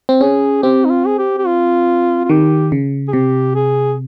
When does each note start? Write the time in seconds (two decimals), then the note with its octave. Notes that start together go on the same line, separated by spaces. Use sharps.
0.09 C4
0.21 C#4 G#4
0.63 C4 G4
0.85 D#4
0.90 F4
1.07 G#4
1.19 G4
1.38 G4
1.46 F4
2.25 F4
2.29 D#3 G4
2.72 C#3
3.08 G#4
3.13 C3 G4
3.55 G#4